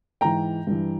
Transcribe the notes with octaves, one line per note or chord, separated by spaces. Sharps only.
G#2 E3 G5 A#5
G2 E3